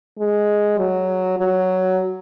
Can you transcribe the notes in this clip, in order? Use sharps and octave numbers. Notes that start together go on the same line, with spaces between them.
G#3
F#3
F#3